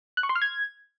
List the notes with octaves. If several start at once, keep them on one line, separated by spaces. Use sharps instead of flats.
F#6
C#6
C6
F6
G#6